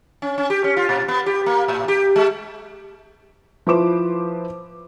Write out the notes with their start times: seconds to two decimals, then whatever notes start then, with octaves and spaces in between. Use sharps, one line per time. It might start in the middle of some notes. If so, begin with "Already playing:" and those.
0.22 C#4
0.38 C#4
0.50 G4
0.64 C#4
0.77 F4
0.89 A#2
1.08 B3
1.26 G4
1.46 A#3
1.68 A2
1.88 G4
2.16 G#3
3.67 F3 E4 B4 C5 D6 E7